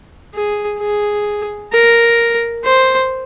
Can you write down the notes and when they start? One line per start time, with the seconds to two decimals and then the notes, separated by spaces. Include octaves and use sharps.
0.35 G#4
0.80 G#4
1.73 A#4
2.65 C5